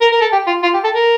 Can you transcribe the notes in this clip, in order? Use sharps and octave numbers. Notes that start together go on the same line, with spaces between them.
A#4
A#4
A4
G4
F4
F4
G4
A4
A#4